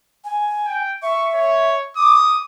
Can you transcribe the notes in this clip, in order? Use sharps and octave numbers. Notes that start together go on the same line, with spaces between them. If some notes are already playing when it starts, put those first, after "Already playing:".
G#5
G5
E5 C#6
C#5
D6 D#6